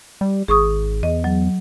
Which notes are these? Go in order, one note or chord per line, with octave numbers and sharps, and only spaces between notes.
G3
G#1 G#4 C#6 D#6
E2 D#5
F#3